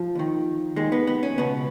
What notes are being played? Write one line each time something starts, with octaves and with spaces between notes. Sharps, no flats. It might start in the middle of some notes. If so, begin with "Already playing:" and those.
Already playing: F3
D#2 D#3
D#2 D#3 G#3
B3
B3
C#4
C#2 B2 B3